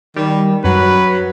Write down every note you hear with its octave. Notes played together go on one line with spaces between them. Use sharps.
D#3 G3
F#2 F#3 B4